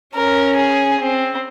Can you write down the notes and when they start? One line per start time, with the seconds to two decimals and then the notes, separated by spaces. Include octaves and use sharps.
0.15 C#4 A#4
0.56 G#4
0.99 C4